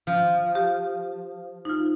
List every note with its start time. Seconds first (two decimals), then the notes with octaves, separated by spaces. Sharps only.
0.07 F3
0.55 G4
1.65 D#4 F4